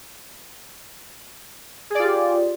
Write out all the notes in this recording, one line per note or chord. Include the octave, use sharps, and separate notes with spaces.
F4 G4 G#4 D5